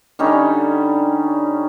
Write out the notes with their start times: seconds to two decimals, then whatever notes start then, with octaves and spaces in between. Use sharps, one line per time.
0.19 D3 G3 C#4 D#4